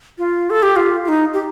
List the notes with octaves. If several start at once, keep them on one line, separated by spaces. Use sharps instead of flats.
F4
A4
G4
F4
F4
D#4
G4